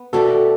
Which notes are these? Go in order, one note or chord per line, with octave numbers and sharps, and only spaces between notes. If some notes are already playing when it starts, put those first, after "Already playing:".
Already playing: B3
B2 A3 D4 F#4 G4 A4